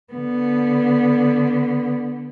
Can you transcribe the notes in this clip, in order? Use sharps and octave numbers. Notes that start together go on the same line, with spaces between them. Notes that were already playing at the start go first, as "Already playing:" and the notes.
D3 B3